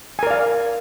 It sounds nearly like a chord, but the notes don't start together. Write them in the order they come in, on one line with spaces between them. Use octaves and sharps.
G#5 A#4 D5 F5